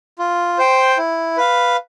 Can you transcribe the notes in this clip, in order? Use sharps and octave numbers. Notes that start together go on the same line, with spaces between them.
F4
C5 G5
E4
B4 F5